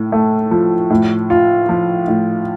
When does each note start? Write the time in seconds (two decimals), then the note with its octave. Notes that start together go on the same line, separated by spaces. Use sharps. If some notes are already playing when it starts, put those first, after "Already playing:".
Already playing: A2
0.12 A3
0.51 F3
0.90 A2
1.30 F4
1.69 F3
2.08 A2